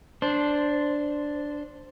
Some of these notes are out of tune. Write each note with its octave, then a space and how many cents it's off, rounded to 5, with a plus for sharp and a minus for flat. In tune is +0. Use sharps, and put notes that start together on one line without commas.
D4 +0 C5 +0